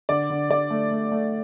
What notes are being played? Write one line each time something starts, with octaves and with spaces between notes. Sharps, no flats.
D3 D5
D3
D3 D5
A3
A3
A3